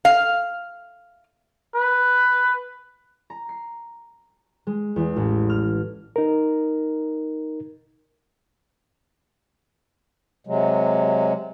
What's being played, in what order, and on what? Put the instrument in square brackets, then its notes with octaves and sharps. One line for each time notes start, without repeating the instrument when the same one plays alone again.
[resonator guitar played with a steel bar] F5
[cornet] B4
[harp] A#5
C7
G#3
E2
A1
F6
[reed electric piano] D#4 A#4
[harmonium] C3 F#3 G#3